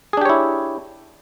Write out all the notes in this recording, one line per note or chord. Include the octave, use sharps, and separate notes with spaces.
D4 E4 G4 G#4 C#5